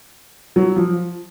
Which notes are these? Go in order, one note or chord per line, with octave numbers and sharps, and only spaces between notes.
F#3
F3